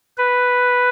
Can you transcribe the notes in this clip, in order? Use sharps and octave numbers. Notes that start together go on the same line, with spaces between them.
B4